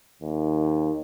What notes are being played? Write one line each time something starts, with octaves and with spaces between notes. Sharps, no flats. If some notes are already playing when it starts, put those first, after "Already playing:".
D#2